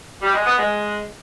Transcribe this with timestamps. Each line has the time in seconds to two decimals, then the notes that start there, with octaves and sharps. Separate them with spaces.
0.22 G3
0.34 G#3
0.46 B3
0.58 G#3